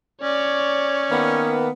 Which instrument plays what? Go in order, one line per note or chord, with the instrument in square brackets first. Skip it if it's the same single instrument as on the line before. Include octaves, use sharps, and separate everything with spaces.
[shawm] C#4 [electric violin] C#5 D5
[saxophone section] D#3 A#3 B3